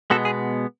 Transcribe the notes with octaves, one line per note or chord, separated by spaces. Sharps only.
B2 G#3 B3 F#4 A4
G#4